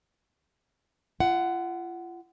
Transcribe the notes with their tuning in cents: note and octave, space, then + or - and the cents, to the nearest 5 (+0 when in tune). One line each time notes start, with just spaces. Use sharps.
F4 -35 F#5 +15